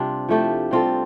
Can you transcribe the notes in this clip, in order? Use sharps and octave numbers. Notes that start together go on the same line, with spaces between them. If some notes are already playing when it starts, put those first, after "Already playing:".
Already playing: C3 G3 C4 D4 F4 G4
F3 A3 E4 G4
G3 C4 F4 A4